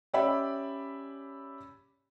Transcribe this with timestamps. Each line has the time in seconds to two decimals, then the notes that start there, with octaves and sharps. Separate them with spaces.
0.14 C#4 G4 D5 E5 B5